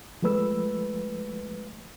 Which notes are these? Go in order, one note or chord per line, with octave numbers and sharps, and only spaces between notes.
F3 G#3 A3 B4 E6